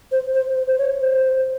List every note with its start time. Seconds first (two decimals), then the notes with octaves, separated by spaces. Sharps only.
0.12 C5
0.34 C5
0.56 C5
0.68 C5
0.78 C#5
1.01 C5